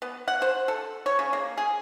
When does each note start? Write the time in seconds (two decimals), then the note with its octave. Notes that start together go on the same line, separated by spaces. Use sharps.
0.02 B3
0.28 F#5
0.42 C5
0.68 A4
1.06 C#5
1.19 C#3
1.33 A#3
1.57 G#4